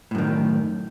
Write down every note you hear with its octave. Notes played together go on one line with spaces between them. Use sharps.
F#2 A2 D#3